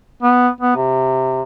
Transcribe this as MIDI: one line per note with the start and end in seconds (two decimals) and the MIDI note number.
0.23 0.49 59
0.61 0.76 59
0.76 1.42 48